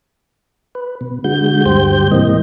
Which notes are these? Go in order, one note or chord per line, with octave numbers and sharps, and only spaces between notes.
B4
B2
D3 G#3 F#4 G6
D2 G2 G4 C5 G6
G#2 C3 E3 A#3 D#5